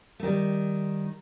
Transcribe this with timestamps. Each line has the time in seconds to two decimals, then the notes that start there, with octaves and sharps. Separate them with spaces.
0.20 A3
0.23 D#3 G3